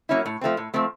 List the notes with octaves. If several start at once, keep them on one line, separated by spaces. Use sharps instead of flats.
F#3 A#3 C#4 E4
A2
F3 A3 C4
A2
F3 A3 C4